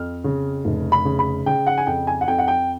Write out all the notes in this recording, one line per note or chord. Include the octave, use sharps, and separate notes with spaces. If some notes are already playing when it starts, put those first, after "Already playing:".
Already playing: F2 F6
C#3
F1
B5
C#3
B5
C#3 G5
F#5
G#5
F2 G5
G#5
F#5
F2 G5
F#5
G5